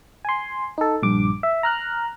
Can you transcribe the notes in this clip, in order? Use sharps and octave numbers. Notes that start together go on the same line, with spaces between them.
G#5 C6
D#4 A4
A#1 G2 D6
E5
A#5 F6 F#6